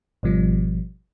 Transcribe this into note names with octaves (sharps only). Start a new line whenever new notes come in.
G#1 B2 F3 G3